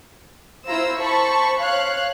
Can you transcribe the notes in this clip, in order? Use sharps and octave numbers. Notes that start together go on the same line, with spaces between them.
E4 F4 C5 A#5 E6
C5 A5 B5 C#6
C#5 F5 F#6